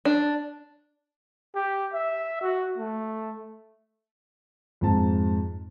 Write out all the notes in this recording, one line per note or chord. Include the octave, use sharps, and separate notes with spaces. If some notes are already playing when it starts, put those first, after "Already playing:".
D4
G4
E5
F#4
A3
F2 G#2 A5